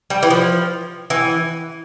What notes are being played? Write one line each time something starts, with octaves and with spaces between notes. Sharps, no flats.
G3
E3
F3
E3